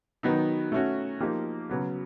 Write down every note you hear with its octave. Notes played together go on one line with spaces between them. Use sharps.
D#3 F#3 B3 D#4
A3 C#4 F#4
F3 A#3 D#4 G4
C#3 F#3 B3